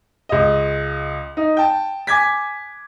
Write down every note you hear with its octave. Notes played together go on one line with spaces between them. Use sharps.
C#2 D#5
D#4
G5 A5
G#5 D6 G#6 B6